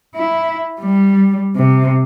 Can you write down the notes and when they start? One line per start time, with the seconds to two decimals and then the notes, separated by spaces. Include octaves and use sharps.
0.16 E4
0.81 G3
1.56 C3